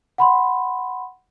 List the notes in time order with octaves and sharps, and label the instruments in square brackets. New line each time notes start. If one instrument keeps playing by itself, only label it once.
[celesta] F#5 B5 C6